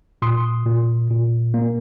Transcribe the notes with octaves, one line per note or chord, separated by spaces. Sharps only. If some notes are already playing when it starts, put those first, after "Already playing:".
A#2 C6 D#6
A#2
A#2
A#3